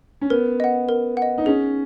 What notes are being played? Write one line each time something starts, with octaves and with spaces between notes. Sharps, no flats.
C#4
B3 A#4
D#5 F#5
A#4
F#5
D#5
D#4
C#4 G#4